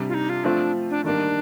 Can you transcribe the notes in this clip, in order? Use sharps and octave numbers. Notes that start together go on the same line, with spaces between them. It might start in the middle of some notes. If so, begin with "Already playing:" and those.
Already playing: C3 G3 D4
F4
D#4
F4
F3 A3 C4 D4 F4
D4
D#3 G3 A#3 D4